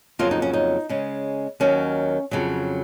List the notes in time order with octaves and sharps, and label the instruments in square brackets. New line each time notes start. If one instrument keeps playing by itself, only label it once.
[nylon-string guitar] F2 C#3 F#3 A#3 F4
D#4
C#4
D#4
C#3 G#3 C#4
D#2 D#3 F#3 C#4
F2 C#3 F#3